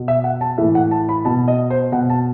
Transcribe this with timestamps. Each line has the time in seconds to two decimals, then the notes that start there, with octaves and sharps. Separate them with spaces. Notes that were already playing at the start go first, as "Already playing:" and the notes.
Already playing: B2
0.08 E5
0.24 F#5
0.41 A5
0.58 A2 E3 E5
0.75 F#5
0.91 A5
1.09 B5
1.25 B2 A5
1.48 D#5
1.70 C5
1.92 B2 F#5
2.10 A5